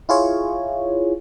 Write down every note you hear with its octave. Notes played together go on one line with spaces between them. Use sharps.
E4 F4 G#4 C#5